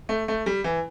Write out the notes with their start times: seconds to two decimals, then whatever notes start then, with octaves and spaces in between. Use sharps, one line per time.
0.09 A3
0.28 A3
0.46 G3
0.64 E3